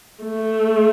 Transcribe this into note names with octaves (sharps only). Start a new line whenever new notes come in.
A3